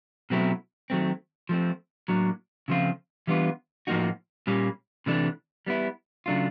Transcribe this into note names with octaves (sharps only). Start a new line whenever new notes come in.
B2 F#3 A3 C4 E4
D#3 F#3 A3 C4
F3 A3 C4
A2 F#3 A#3 D4
C#3 F3 A3 C4 F4
E3 G3 B3 D4 F4
A2 F3 A#3 D#4 F#4
A#2 G3 A#3 C#4
C3 E3 A3 D4
G3 B3 E4
C#3 F#3 A3 D4 F4